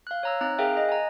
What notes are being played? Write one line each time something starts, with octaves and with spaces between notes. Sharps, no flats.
F5 F#6
C#5 A#5 E6
C4 D#4 A#5 F#6
G#4 A#4 E5 F5 G5 F#6
D#5 F#6
G#5 A#5